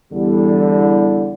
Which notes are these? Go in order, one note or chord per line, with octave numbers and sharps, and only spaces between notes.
E2 D3 G3